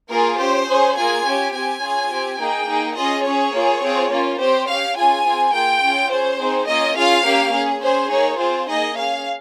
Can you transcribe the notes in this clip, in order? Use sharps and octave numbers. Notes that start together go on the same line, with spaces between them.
A#3 F4 G#4 A#4
C#4 G4 C5
C#4 G#4
A#3 F4 G#4 G#5
C#4 G4
C4 G4 G#5
C#4 F4 G#4
C4 G4
A#3 D#4 G#4 G5
A#3 D#4 G#4
C#4 F4 G#4 D#5
C#4 G#4 C#5
A#3 F4 G#4
C4 F4 G#4
A#3 C#4 F4
C4 G4 C5
C#4 G4 F5
C#4 F4 G#4 G#5
C4 F4 G#4
A#3 F4 G#4 G5
C#4 F4 G#4
C#4 G#4 C5
C4 D#4 G#4
A#3 C#4 F4 D#5
C#4 F4 G#4 F5
A#3 C#4 G4
C#4 G#4
C#4 G#4 C5
A#3 D#4 G#4 C#5
C4 F4 G#4 C5
A#3 D#4 G#4 D#5
C#4 G#4 F5